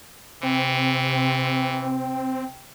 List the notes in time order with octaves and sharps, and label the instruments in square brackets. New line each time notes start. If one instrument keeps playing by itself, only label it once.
[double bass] C3 [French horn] E3 [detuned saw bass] C4 [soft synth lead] G5